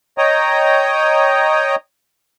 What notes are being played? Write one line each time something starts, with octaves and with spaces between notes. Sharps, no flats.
C#5 D#5 G5 A#5 D#6